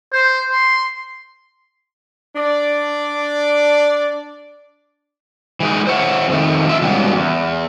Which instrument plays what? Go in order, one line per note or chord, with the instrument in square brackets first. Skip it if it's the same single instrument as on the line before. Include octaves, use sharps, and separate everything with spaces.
[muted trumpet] C5
C6
[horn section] D4 D5
[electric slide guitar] E3 G#3 D#4
C5 C#5 E5 F#5
F2 D#3 A3
F4 E5
G#2 C#3 F#3 G3 B3
E2